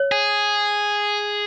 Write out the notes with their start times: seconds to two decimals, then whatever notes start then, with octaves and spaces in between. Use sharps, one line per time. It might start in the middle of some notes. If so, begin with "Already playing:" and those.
Already playing: C#5
0.12 G#4